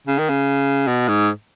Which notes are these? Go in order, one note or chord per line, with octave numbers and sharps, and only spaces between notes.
C#3
D#3
C#3
B2
G#2